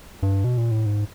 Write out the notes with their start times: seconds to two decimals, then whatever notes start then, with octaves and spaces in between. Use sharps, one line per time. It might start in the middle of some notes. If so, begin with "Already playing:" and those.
0.23 G2
0.44 B2
0.57 A#2
0.71 A2
0.86 G#2